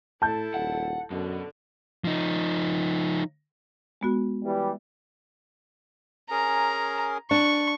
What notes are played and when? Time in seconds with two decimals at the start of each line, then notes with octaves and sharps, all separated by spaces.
0.22 A2 E4 A4 A5 G6
0.54 D#1 F#5
1.11 F#2 B2 D3
2.04 F3 D#4
4.01 G#3 B3 F#4
4.45 E3 G3
6.30 C#4 G#4 A#4 A#5
7.31 D4 C#6